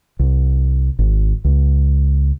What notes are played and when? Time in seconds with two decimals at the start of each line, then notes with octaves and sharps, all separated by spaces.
0.19 C2
0.99 G#1
1.44 C#2